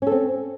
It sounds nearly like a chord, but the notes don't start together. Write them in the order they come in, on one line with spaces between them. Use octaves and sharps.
C#4 A4 C4